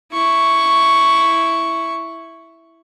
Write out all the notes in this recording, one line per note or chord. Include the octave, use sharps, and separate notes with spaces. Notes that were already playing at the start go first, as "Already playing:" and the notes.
E4 C#6